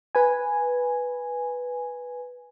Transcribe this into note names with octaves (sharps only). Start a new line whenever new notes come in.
B4 G#5